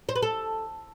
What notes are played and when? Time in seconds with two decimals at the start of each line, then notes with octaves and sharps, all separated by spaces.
0.09 C5
0.16 B4
0.22 A4